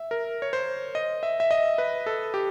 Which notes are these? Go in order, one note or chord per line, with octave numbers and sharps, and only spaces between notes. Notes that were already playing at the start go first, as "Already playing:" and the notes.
Already playing: E5
A#4
C#5
C5
D#5
E5
E5
D#5
B4
A4
G4